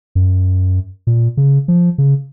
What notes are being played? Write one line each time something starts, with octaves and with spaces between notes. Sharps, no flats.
F#2
A#2
C#3
F3
C#3